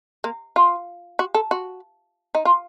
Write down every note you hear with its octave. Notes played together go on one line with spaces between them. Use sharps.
A#3
F4
F#4
A4
F#4
D#4
F4